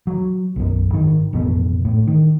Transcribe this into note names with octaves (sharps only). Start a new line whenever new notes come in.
F#3
B1 F#2
G#1 D#3
A1 F2 B2
A2
D#3